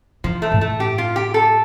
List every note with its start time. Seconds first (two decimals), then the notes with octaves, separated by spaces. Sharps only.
0.24 E3 F3
0.42 A3
0.52 A2
0.61 A3
0.80 G4
0.98 F4
1.16 G4
1.34 A4